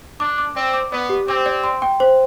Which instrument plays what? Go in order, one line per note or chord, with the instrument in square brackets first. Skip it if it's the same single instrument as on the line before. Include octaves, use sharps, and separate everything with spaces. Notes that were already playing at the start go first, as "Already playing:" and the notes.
[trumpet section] D4 [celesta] D6
[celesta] D6
[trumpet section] C4 [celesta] D5
[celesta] D6
[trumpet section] B3 [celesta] D5
[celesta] G4
[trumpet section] C4 [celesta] D6
[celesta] D5
C6
G5
C5